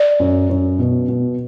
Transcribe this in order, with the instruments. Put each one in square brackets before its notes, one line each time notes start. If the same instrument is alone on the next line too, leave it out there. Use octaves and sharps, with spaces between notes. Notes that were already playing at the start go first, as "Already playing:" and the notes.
Already playing: [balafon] D5
[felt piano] F#2
F#2
B2
B2